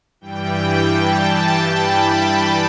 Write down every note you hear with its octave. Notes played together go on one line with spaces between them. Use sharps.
G2 E3 G3 G5
A5
B5